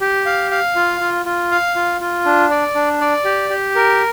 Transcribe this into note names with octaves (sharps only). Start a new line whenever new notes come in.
G4
F5
F5
F4
F4
F4
F5
F4
F4
D4
D5
D4
D5
G4
G4
A#4